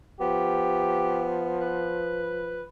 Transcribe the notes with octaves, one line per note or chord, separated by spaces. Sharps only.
F3 B3 G4
B4